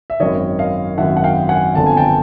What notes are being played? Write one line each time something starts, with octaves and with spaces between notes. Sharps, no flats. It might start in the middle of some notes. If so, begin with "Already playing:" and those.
E5
G#1 F#2 D#3 C#5 D#5
D#5 F5
G#1 F#2 D#3 E5 F#5
F#5
F5 G5
F#5 G#5
G1 F2 D3 A5
G#5
G5 A5